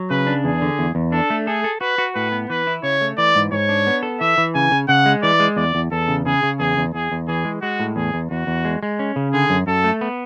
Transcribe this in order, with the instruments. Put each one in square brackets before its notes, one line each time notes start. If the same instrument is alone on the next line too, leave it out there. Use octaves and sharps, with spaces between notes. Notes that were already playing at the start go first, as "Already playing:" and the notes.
Already playing: [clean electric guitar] F#3
[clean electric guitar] C#3 [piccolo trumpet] B4
[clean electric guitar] D4
[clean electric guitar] E2 [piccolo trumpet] G#4
[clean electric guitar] D3
E2
E2
[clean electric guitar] D4 [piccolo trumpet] A4
[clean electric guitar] A3
[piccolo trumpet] G#4 [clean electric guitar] A4
[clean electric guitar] A4
[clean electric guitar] F#4 [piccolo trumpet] B4
[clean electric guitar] F#4
[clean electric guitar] A2 [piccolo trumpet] B4
[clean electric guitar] B3
[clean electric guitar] E3 [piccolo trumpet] B4
[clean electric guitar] E4
[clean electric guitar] C#3 [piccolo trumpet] C#5
[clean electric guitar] A3
[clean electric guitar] E3 [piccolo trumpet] D5
[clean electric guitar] G#2
[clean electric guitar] G#2 [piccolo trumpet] C#5
[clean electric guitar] D4
B3
A4
[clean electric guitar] E3 [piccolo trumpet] E5
[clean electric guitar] E3
[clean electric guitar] C#3 [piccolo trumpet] G#5
[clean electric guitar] C#3
[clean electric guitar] C#3 [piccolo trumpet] F#5
[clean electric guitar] G#3
[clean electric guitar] E3 [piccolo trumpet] D5
[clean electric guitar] G#3
[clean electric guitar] E2 [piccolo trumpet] D5
[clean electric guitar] E2
[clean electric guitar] E2 [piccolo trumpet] A4
[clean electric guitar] C#3
[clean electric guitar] C#3 [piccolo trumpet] G#4
[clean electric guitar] C#3
[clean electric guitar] E2 [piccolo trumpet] G#4
[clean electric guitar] E2
[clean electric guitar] E2 [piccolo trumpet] G#4
[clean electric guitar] E2
[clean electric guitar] E3 [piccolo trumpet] G#4
[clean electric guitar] G#3
[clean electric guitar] G#3 [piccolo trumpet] F#4
[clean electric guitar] A2
[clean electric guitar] E2 [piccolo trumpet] G#4
[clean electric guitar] E2
[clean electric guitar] E2 [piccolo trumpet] F#4
[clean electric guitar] E2
G#3
G#3
C#4
C#3
[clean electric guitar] D3 [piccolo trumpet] G#4
[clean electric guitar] F#2
[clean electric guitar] F#2 [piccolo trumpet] A4
[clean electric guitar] A3
B3